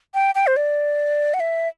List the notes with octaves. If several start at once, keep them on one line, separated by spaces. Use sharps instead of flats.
G5
G5
C5
D5
F#5
E5